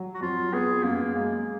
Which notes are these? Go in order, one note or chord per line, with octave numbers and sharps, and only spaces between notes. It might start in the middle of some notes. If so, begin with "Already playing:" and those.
Already playing: F#3
F#4
F2 F4
B3 G#4
F#2 A#3
G#3 A#3